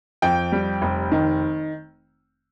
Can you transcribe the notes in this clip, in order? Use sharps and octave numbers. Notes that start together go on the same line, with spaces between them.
F2 G5
G3
F1
D#3